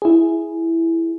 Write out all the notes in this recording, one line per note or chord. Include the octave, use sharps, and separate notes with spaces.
E4 G#4